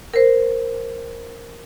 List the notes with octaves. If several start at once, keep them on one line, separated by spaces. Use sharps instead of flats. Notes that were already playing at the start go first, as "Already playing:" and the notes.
A#4 C5